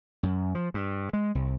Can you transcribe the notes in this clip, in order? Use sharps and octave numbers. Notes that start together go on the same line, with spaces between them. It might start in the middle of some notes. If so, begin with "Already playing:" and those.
F#2
F3
G2
G#3
C2